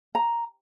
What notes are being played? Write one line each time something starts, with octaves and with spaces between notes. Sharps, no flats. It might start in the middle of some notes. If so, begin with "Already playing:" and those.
A#5